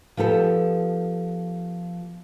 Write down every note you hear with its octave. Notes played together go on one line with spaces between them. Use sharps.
F3 B3 G4 A4